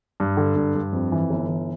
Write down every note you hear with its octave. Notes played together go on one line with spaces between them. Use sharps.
G2
D3
G2
G2
F2
E3
G1
E3